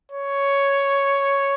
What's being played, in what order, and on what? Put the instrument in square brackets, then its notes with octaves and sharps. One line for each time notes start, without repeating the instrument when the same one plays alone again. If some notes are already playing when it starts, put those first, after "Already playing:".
[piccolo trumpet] C#5